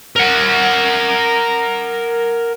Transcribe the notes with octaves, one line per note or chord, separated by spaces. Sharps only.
A#4 F#5